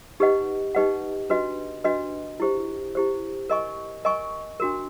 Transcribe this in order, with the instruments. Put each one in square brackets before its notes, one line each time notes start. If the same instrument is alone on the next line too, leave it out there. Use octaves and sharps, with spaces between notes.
[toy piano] D#4 G4 B4 D#5 F#5
D#4 G4 B4 D#5 F#5
D4 F#4 B4 D#5
D4 F#4 B4 D#5
E4 G4 C5
E4 G4 C5
A#4 D#5 G#5 C#6
A#4 D#5 G#5 C#6
D4 F#4 A#4